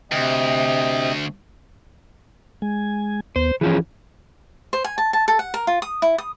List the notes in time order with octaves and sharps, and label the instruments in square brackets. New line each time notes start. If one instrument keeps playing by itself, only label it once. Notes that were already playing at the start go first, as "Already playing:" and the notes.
[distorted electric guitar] D2 [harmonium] C3 D#5 G5
[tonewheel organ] G#3 G#5
[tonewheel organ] D#2 B3 [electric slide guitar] C5
[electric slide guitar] E3 F3 C#4 [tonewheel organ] G#4
[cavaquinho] C5
G#5
A5
A5
A4
F#5
A#4
F4
D#6
E4
D#6